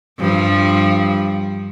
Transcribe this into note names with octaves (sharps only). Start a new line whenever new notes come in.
G2 F3